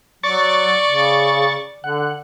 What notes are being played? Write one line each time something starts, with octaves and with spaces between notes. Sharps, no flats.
F#3 D5 C#6 A6
C#3
D3 F#5